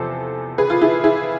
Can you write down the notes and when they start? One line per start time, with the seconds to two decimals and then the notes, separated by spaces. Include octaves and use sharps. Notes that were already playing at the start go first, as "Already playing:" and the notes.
Already playing: E2 C3 F3 A4 C5
0.58 G#4 B4
0.70 F4
0.81 E4 G#4
1.04 E4 G#4